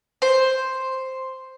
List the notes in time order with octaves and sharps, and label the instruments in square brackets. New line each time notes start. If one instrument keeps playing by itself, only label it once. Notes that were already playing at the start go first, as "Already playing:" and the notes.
[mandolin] C5